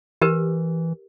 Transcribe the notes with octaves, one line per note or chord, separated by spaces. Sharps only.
E3 G4 A#4 B4